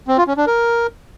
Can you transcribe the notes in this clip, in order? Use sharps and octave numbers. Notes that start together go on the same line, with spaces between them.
C4
F4
C#4
D4
A#4